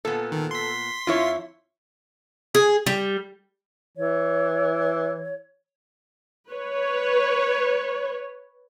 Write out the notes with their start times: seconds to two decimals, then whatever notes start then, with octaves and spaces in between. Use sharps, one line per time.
0.05 A#2 B3 A4
0.32 D#3
0.51 C6 B6
1.07 F2 E4 F4 C#5
2.55 G#4
2.86 G3
3.97 E3 C#5
6.51 B4 C#5